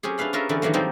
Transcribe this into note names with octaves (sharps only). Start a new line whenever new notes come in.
F#3 C4 C#4 G4 G#4
D4 E4 B4 F5 B5
C#4 F4 A#4 B4 D#5 E5
D3 E3 C4 C#4 B4 D5
G#2 D#3 E3 F#3 A#3
D#3 F3 G3 A#3 C4 D#4